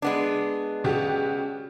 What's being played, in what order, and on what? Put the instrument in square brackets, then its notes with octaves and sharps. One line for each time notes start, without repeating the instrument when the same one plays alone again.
[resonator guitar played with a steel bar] G#3 B3 D4
[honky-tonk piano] C#3 F#4 G4